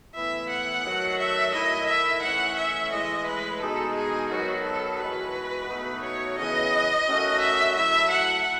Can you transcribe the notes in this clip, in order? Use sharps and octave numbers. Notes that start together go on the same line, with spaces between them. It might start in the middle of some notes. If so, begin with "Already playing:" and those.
A2 E3 B3 E4 E5
F#5
D#3 F#3 A3
E5
D#3 A3 E4 D#5
E5
A2 E3 A3 C#4 F#5
E5
A2 E3 G#3 D#5
B4
B2 G#3 D#4 A4
G#4
D#3 F#3 B3 F#4
A4
E3 G#3 B3 F#4 B4
B2 A3 D#4 F#4
C#5
C#3 E3 B3 D#5
D#3 A3 C#4 F#4
E5
F#3 A3 E4 E5
F#5